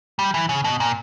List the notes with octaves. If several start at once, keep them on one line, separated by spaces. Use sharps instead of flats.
G3
E3
C#3
B2
A#2